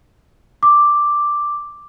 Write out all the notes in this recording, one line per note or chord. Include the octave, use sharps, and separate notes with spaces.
D6